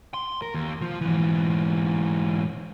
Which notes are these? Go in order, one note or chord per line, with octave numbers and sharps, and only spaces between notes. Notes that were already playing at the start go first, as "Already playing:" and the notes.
C6
A#4
D#2
F3
G#2 E3